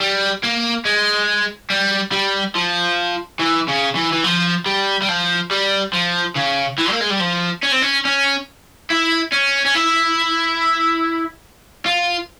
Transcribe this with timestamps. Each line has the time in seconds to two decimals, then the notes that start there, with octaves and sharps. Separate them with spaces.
0.01 G3
0.43 A#3
0.85 G#3
1.70 G3
2.12 G3
2.55 F3
3.39 E3
3.68 C#3
3.95 E3
4.12 E3
4.24 F3
4.66 G3
5.02 G3
5.09 F3
5.51 G3
5.93 F3
6.35 C#3
6.78 E3
6.91 A#3
7.00 G#3
7.10 G3
7.20 F3
7.63 C#4
7.72 C4
7.82 C#4
8.05 C#4
8.90 E4
9.32 C#4
9.65 C#4
9.75 E4
11.86 F4